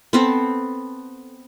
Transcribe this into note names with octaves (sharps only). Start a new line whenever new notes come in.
B3 C4 A4